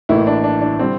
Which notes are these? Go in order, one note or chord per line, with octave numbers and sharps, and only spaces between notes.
A1 A2 E3 A#3 E4
D4
D4
D4
D3 G3 C4